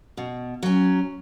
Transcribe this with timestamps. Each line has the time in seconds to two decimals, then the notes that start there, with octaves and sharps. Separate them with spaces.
0.17 B2
0.63 F#3 C#4